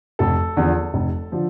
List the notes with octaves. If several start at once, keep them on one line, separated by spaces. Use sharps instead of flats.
F1 A4
E2 D3 F3
F1
D3 F3